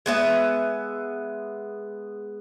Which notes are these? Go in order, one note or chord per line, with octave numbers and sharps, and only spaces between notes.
G#3 B3 E5